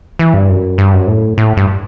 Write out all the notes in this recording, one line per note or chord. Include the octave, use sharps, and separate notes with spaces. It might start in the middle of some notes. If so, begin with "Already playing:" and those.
E3
G2
F#2
G2
F#2
A2
A2
G2